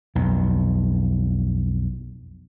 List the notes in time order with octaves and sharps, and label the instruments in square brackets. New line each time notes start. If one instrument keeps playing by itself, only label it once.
[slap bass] B1 F2